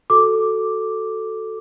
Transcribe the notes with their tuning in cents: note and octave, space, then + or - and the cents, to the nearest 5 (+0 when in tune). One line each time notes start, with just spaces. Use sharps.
F#4 +0 A4 +0 D6 +0